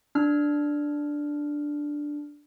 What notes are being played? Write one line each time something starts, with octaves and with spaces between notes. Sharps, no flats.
D4 F6